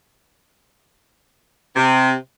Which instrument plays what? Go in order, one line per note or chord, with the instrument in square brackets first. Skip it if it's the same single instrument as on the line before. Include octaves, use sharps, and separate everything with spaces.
[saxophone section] C3